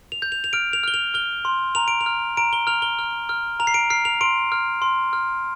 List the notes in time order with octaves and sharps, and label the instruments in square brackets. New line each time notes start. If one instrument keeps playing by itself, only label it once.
[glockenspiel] F7
G6
F7
F7
F6 D7
F7
F6 G7
F7
F6 G7
C6
A#5 F7
D7
F7
F6
A#5 D7
G7
F6 F7
G7
F6
F6
A#5 F7
C7
D7
F6 C7
F7
C6 D7
F6
C6
F6